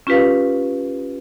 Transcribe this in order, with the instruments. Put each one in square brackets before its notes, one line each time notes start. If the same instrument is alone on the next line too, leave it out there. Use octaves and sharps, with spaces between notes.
[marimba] C#4 F4 G4 B4 F5